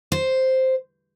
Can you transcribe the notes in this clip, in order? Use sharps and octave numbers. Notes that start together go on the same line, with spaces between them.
C5